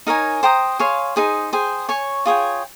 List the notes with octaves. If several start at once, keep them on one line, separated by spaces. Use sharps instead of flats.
D#4 A#4 C#5 G#5
C5 G5 A#5 D#6
G#4 C#5 F5 C6
D#4 G#4 C5
G#4 C5 G5
C#5 G#5 C#6
F4 G#4 C#5 G5